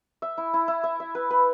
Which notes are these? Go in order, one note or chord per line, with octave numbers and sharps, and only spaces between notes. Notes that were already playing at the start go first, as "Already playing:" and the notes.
E5
E4
E4
E4
E5
E5
B4
B4